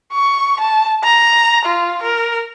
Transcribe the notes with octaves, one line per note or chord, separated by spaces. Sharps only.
C#6
A5
A#5
F4
A#4